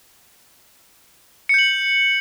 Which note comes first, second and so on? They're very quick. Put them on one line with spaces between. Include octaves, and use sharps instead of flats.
C#7 G6 F#7